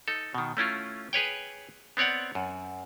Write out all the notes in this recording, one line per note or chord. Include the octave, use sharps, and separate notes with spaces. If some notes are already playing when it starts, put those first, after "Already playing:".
D#4 A4
B2 D#3
A3 C#4 E4 F4
G#4 B4 C#5 G5
B3 C4 C#5 D5 F#5
F#2